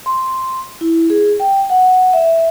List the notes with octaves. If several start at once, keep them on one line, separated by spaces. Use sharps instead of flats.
C6
E4
G#4
G5
F#5
E5